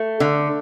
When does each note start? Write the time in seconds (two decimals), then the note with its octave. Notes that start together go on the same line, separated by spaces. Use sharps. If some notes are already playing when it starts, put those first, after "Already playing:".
Already playing: A3
0.20 D3